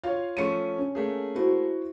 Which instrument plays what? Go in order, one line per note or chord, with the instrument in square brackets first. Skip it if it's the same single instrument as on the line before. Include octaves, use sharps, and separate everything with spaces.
[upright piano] F4 C#5 [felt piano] F5
[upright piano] F3 A3 C#4 [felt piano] C#6 C#7 D#7
[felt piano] C#4
[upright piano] A3 A#3 G#4
[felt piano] E4 F#4 C5